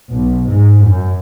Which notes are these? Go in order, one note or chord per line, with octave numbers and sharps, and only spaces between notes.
B1
G#2
F#2